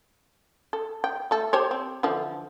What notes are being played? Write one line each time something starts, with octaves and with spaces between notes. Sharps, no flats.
A4
G5
A3 A4
G4 C5 C#5
C4
D3 E3 F3